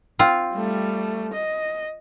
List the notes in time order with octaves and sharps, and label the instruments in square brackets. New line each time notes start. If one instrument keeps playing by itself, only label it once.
[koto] C4 F4
[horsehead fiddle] G3 A3
D#5